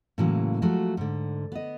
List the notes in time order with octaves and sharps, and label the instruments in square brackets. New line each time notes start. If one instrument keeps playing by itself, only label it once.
[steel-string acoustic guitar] A2 C#3 E3 F#3 G#3 A#3
F3 F#3 G#3 A3 F#4
G#2 D3
B3 D#5